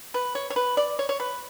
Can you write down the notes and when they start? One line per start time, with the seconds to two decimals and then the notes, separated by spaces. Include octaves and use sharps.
0.14 B4
0.35 C#5
0.50 C#5
0.56 B4
0.77 D5
0.99 C#5
1.09 C#5
1.20 B4